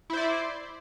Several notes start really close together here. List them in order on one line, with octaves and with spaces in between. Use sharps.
E4 C5 D5